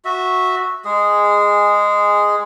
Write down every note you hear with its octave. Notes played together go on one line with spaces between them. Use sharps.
F#4 E5
G#3 G#4